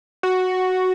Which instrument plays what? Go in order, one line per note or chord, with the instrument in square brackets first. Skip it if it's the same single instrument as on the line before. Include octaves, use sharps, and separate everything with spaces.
[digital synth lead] F#4